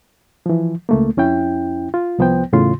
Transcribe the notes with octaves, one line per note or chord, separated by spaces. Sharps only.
E3 F3
C#2 A3 A#3
F2 C#4 E4 G5
F4
C2 F3 B3 C5 G5
E2 A2 C#3 F4 C6